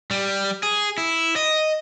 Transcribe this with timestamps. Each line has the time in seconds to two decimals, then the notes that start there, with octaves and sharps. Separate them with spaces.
0.11 G3
0.63 G#4
0.98 E4
1.36 D#5